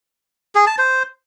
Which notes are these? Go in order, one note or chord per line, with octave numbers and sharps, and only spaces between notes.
G#4
A5
C5